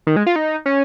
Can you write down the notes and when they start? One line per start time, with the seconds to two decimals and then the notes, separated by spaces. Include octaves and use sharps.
0.07 D#3
0.16 G#3
0.26 F4
0.36 D#4
0.66 C#4